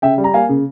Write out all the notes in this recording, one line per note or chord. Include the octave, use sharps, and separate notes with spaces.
C#3 E5 G5
G3
A#5
A#3 F5 G#5
C#3